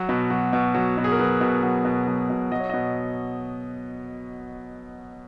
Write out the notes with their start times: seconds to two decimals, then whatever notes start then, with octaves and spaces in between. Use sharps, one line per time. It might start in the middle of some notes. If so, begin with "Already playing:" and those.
Already playing: F#3
0.09 B2
0.30 F#3
0.53 B2
0.75 F#3
0.98 B2
1.04 G#4
1.12 A#4
1.19 F#3 B4
1.41 B2
1.63 F#3
1.85 B2
2.08 F#3
2.30 B2
2.52 F#3 D#5
2.60 C#5
2.70 B2 D#5